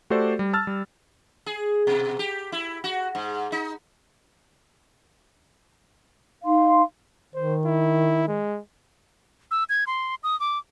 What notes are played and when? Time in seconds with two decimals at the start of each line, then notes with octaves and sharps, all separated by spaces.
0.10 A3 F#4 G4 A4 C5 D5
0.39 G3
0.53 A5 E6 F6 A6
0.67 G3
1.46 G#4
1.87 B2
2.19 G4
2.52 E4
2.84 F#4
3.15 G#2
3.52 D#4
6.44 D#4 F5 C6
7.35 D#3 C5
7.65 E4
8.28 G#3
9.51 E6
9.69 G#6
9.87 C6
10.23 D#6
10.40 D6